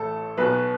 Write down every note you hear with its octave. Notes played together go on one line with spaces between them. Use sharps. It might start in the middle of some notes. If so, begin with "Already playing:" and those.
Already playing: A1 A2 A4
B1 B2 B4